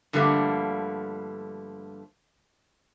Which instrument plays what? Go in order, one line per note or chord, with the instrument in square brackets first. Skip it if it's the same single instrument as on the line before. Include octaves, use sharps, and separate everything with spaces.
[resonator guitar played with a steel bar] G2 D3 F3 G3 A3 A#3